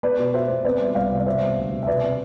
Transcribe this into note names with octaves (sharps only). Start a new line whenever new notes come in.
B3 B4 D5
B2
B2 C5 E5
B3
C4 B4 D5
G3
C2 D5 F5
C3
D5
B3 C5 E5
G3
D2
C3
E5
B2 B4 D5
C4